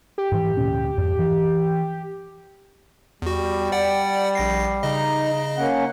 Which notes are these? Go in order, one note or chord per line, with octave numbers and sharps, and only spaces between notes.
G4
G#2 E3
D2 A#2 C#4
F2 G#2
E3
E2 G3 F#4
D5 F#5 G5
A#1 A#6 C7
C#3 D#4 D#5
A#3 C#4 F#5